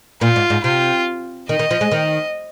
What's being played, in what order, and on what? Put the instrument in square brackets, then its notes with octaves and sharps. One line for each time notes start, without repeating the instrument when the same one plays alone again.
[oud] A#2 [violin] F4
[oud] G#2
G#2
[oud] C3 [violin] F4
[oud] D#3 [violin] D#5
[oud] D#3
F3
G#3
D#3